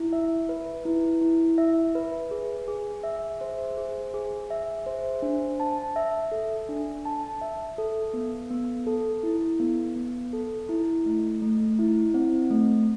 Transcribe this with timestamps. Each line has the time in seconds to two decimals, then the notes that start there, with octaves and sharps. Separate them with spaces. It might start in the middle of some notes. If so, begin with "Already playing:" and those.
Already playing: E4
0.13 E5
0.49 B4
0.85 E4
1.21 E4
1.58 E5
1.95 B4
2.31 G#4
2.68 G#4
3.04 E5
3.41 C5
3.77 G#4
4.14 G#4
4.50 E5
4.86 C5
5.22 D4
5.60 A5
5.96 E5
6.32 A4
6.69 D4
7.05 A5
7.41 E5
7.78 A4
8.14 B3
8.50 B3
8.87 A4
9.23 E4
9.60 B3
9.96 B3
10.33 A4
10.69 E4
11.06 A3
11.42 A3
11.79 E4
12.14 C4
12.51 A3